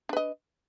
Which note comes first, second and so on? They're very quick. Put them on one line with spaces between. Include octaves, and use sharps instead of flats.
D4 B4 D#5